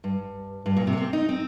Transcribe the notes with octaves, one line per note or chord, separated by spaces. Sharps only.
G2
G2
A#2
C3
A#3
C4
D#4
C4